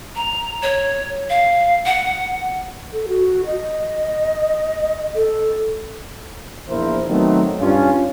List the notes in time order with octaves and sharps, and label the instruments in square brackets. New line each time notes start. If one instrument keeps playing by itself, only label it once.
[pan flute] A#5
C#5
F5
F#5
[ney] A4
F#4
D#5
A4
[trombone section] A#1 E2 A#2 E4 A#4 C5
D#3 F#3 A3 B3 C4 D#4
G2 C#4 F4